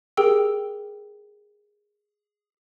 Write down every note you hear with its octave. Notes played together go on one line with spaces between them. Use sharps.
G4 G#4 A#4 G5 E6